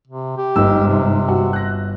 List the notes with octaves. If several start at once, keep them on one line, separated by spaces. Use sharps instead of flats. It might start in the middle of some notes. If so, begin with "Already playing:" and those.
C3
G4
G1 G#2 D#5 E6
C3
F#4
F#6 A#6